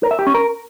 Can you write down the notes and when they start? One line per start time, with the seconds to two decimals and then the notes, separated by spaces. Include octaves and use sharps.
0.03 A#4
0.11 E5
0.19 G4
0.27 C#4
0.34 A#4